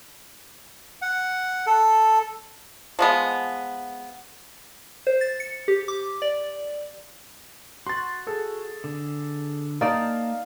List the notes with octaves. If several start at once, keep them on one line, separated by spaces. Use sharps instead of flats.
F#5
A4
F3 G#3 B3
C5
A6
C#7
G4
D6
D5
F#4 C6 A6
G#4 A4
D3
A#3 D#4 D5 F5 A5 A#5